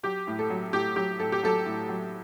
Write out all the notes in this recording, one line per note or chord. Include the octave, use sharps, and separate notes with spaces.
F#3 G4
A2
A4
F#3
A2 G4
F#3 G4
A2 A4
G4
F#3 A4
A2
F#3